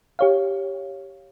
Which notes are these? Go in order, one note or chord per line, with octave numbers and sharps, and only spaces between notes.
G4 C#5 F5